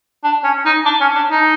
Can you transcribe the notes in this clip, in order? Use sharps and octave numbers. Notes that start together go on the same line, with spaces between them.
D4
C#4
D#4
D4
C#4
D4
D#4